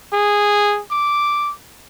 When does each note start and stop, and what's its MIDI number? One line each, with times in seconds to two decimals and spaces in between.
0.13 0.80 68
0.91 1.52 86